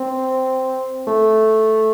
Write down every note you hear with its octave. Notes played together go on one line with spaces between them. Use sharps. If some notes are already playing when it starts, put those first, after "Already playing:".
Already playing: C4
A3